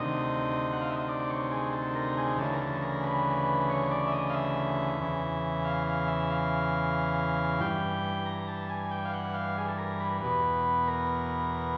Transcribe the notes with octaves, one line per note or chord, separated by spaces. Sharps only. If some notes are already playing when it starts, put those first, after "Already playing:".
Already playing: D2 C3 D#3 D#5
F#5
F5
E5
D#5
D5
C#5
G#4
A4
A#4
G#4
D2 C#3 E3 A4
A#4
A4
A#4
B4
C#5
D5
E5
D#5
F5
E5
E2 C#3 E3
F5
F5
E5
F5
G2 E3 G5
A#5
A#5
A5
G#5
G5
F5
F#5
F5
G#4
A4
A#4
B4
E2 B2 B4
A#4